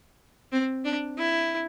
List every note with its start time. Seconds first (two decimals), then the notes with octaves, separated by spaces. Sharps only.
0.52 C4
0.85 D4
1.18 E4